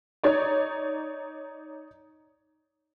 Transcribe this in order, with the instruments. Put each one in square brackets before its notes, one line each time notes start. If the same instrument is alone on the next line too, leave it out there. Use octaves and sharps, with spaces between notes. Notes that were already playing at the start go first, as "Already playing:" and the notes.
[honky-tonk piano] D#4 C#5 D5